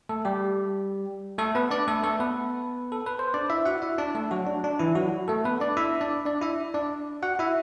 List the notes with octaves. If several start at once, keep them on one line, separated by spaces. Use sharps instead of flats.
A3 A4
G3 G4
A3 A4
B3 B4
D4 D5
A3 A4
A3 A4
B3 B4
A4
B4
C5
D4 D5
E4 E5
F#4 F#5
E4 E5
D4 D5
A3 A4
F#3 F#4
D4
D4
E3 E4
F#3 F#4
A3 A4
B3 B4
D4 D5
E4 E5
D4 D5
D4 D5
E4 E5
D4 D5
F#4 F#5
E4 E5